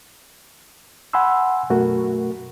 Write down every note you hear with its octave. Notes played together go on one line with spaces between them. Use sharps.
F#5 G#5 B5 C6 E6
F#2 B2 A3 F#4 A#4